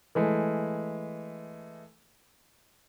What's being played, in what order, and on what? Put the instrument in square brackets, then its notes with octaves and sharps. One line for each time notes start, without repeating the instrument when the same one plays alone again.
[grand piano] E3 G#3 A3